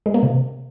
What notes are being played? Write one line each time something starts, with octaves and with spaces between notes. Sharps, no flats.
G#3
A#3
C3